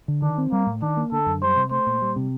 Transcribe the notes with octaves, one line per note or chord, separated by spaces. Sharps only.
D3
D#3 D4
C4
G3 A#3
A2
D#3 D4
A#3
D3 A4
F#2
G3 C5
C3
A3 C5
A#2
G3
C3